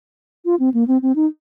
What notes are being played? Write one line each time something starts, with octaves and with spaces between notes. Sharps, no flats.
F4
C4
A#3
C4
C4
D#4